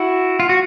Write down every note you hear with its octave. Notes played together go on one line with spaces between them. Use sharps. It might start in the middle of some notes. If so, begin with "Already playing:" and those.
Already playing: E4 F#4
F4
F#4